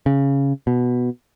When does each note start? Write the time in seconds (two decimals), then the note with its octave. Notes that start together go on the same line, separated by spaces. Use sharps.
0.06 C#3
0.67 B2